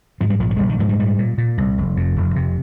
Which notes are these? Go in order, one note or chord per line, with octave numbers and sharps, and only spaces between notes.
G#2 F3
G3
A#1 F3
F3
G#3
A#1 G3
D#3
G#2 F3
G3
A#2 G3
A#2
A#2
C2
F1
F2
F1
C3